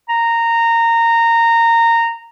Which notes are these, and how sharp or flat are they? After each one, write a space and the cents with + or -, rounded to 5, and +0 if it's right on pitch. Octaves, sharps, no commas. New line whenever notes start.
A#5 -15